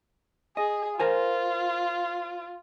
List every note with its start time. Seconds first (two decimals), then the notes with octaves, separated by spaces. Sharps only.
0.57 G#4 D#5
1.00 F4 A#4 C5 G#5